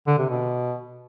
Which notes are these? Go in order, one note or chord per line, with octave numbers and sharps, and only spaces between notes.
D3
C3
B2